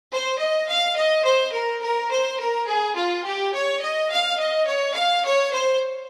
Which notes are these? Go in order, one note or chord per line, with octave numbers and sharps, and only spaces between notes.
C5
D#5
F5
D#5
C5
A#4
A#4
C5
A#4
G#4
F4
G4
C#5
D#5
F5
D#5
C#5
F5
C#5
C5